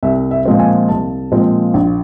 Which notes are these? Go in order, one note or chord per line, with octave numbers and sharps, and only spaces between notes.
C2 E5
E5
A#2 F3 G#3 C4
G#5
C2 A5
A#2 F3 G#3 C4
A#1